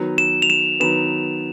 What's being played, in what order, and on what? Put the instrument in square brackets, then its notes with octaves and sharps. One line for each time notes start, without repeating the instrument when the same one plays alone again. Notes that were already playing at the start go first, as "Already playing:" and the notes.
Already playing: [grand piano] D#3 F#3 B3
[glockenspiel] E7
F7
E7
[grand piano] D#3 F#3 B3 [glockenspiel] E7